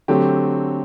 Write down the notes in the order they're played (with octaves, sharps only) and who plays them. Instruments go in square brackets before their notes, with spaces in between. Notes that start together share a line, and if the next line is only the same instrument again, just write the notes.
[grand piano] D3 F#3 A3 C4 G4